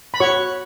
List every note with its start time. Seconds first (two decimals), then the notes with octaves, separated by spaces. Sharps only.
0.14 B5
0.20 F#4 C#5 C#6